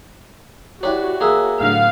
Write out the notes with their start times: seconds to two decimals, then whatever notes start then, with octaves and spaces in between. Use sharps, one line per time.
0.83 D4 E4 F#4 G4 B4 C#5
1.20 A#3 G#4 E5
1.60 A2 D3 F#3 B3 F5